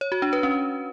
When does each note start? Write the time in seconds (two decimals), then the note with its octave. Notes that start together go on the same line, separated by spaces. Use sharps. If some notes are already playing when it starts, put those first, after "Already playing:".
0.01 C#5
0.12 F#4
0.22 D4
0.33 B4
0.43 C#4